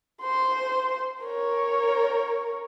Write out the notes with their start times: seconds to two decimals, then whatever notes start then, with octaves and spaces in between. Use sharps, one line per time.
0.21 C5 C6
1.21 A#4 C#5